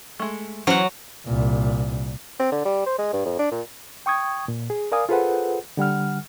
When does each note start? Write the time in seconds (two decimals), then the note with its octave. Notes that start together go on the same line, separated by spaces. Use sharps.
0.20 G#3 A3
0.67 E3 F#3 C#4 C5 F#5
1.27 C2 A#2
2.40 C4
2.52 D3
2.65 G3
2.86 C5
2.98 G#3
3.13 G2
3.25 F2
3.39 D4
3.51 A#2
4.06 G5 C#6 D#6 G#6
4.48 A#2
4.70 G#4
4.92 A#4 D5 F5 G#5 D#6
5.09 F4 G#4 A4 B4 C5 F#5
5.77 D3 G3 F#5 F6